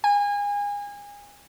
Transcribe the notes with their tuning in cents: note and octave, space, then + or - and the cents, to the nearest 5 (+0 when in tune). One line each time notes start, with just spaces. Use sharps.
G#5 -30